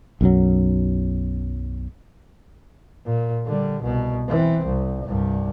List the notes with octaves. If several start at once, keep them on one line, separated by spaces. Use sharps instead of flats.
B1 F#2 F#3
A#2
D3 G3
C2 B2
E3 C4
C2
C2 G2